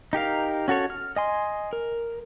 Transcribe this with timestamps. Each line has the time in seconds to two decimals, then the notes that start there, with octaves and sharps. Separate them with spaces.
0.13 D#4 G4 A#4 F5
0.68 C#4 F#4 A4 C#5
0.90 F6
1.16 D#5 G#5 C6
1.73 A#4